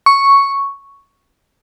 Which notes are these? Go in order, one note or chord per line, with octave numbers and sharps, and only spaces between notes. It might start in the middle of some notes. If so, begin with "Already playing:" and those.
C#6